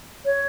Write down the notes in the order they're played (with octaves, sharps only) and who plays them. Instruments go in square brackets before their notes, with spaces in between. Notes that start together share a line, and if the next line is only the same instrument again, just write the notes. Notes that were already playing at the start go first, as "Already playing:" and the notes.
[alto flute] C#5